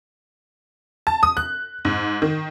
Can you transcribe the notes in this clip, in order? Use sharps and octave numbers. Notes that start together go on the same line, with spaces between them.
A5
D#6
F#6
G#2
D#3